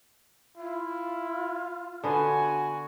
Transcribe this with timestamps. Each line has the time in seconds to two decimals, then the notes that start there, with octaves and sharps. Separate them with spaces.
0.58 E4 F4
2.04 D3 B3 F#4 C5 G#5